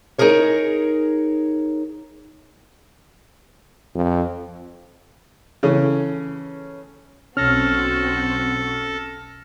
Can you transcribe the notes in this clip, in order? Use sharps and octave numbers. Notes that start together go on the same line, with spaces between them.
D#4 F4 G#4 A#4 C#5
F2
C#3 E3 A3 C#4
B1 C4 C#4 F#4 A4 F6 A#6